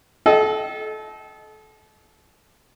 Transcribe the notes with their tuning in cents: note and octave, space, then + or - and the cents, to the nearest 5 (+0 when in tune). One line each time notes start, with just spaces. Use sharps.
A4 -30 D#5 +0 G5 -25